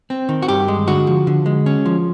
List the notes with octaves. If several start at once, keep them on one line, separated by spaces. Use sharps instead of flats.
C4
D#3
F#4
G2 G4
G#3
D3 F#4
F3
D3
G#3
C#4
F3